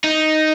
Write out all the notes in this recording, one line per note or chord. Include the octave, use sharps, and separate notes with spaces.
D#4